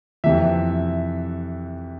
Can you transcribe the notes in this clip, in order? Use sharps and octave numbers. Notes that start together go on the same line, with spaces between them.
F2 C3 E3 E5